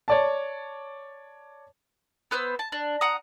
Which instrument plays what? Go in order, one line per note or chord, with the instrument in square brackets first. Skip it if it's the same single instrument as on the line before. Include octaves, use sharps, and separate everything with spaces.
[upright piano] C#5 D5 A5
[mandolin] B3 B4 C5 E6
A5
D4
F#5 A#5 D#6